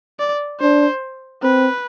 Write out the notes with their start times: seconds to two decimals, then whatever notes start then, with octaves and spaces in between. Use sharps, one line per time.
0.20 D5
0.61 D4 C5
1.43 C4 B4